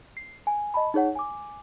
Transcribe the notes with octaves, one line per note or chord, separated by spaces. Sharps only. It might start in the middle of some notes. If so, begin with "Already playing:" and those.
C7
G#5
D#5 A5 B5
D#4 G#4 C#5 F#5
G#5 D6